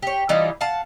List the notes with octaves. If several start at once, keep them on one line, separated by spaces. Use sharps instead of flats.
G4 C#5
E3 G3 D#4 F4
F5 F#5 A5